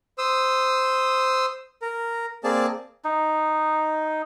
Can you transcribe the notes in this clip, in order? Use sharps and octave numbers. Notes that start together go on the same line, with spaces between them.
C5 D#6 E6
A#4
A#3 C4 G#4 D5 A5
D#4